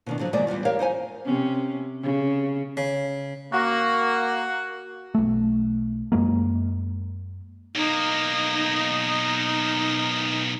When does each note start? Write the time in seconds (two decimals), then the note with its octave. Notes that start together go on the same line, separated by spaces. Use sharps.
0.06 B2 D#3 D4
0.19 D3 F3 F#3
0.33 D#2 B2 F#3 G#3 G#4 D5
0.47 E2 B2 G3 F4
0.65 G4 A#4 C#5 F5
0.79 D#4 C5 F#5 G#5
1.25 C3 C#4
2.03 C#3
2.77 C#3
3.53 A#3 F#4
5.15 B1 A3
6.12 F#2 G#3 A#3
7.75 B1 A#3 D#4